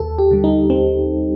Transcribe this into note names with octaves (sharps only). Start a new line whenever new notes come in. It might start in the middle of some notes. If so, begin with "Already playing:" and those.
Already playing: D#2 A4
G4
D3 G3
D#4
D#2 C4